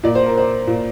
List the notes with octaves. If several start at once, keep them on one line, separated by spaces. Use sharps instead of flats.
A#2 D5
C5
A#4
C5
A#2